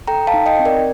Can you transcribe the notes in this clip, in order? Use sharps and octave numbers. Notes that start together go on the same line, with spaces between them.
A4 G5 A#5
F5 A5
D#4
D#5 G5
C4
A#4 D5